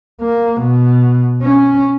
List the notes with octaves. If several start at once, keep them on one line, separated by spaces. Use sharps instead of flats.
A#3
B2
C#4